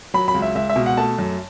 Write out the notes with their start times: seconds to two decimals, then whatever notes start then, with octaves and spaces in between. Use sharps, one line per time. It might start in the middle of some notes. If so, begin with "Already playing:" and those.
0.14 F#3 B5
0.28 B5
0.34 C#2
0.42 E5
0.55 C#2 E5
0.70 E5
0.76 B2
0.86 F#5
0.97 A3 A5
1.18 F#2